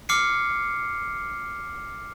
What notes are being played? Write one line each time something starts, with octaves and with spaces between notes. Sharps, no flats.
D6 F6 C7 C#7